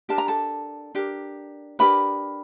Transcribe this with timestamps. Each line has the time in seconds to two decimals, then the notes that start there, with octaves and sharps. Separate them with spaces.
0.09 D4 G4 A#4 A5
0.18 A#5
0.28 A4 A5
0.95 D4 G4 A#4
1.79 D4 G4 A#4 B4 B5